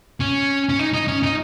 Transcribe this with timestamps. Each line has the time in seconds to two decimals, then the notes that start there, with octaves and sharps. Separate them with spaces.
0.20 C#4
0.69 C#4
0.79 D#4
0.93 D#4
1.08 C#4
1.23 D#4